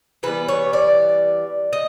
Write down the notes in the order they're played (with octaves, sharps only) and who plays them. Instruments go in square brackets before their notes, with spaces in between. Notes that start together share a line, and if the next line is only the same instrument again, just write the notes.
[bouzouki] E3 G3 B3 B4
C#5
D5
D#5